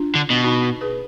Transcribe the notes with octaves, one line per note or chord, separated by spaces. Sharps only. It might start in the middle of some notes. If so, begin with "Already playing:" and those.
Already playing: D4 F4
D3
B2
D#4 F#4
G#4 B4